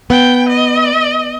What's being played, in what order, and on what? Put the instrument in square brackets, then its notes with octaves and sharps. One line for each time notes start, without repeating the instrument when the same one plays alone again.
[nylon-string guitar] B3 [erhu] G5
[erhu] D#5